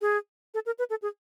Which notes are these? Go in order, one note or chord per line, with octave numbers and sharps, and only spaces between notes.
G#4
A4
A#4
B4
A4
G#4